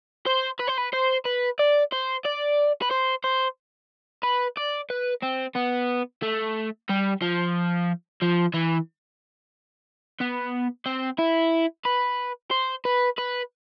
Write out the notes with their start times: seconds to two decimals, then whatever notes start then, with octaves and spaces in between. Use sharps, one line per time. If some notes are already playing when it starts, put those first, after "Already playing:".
0.27 C5
0.60 B4
0.68 C5
0.78 B4
0.93 C5
1.25 B4
1.59 D5
1.93 C5
2.25 D5
2.82 B4
2.91 C5
3.24 C5
4.23 B4
4.57 D5
4.90 B4
5.23 C4
5.56 B3
6.22 A3
6.89 G3
7.22 F3
8.22 F3
8.54 E3
10.20 B3
10.86 C4
11.18 E4
11.85 B4
12.51 C5
12.85 B4
13.18 B4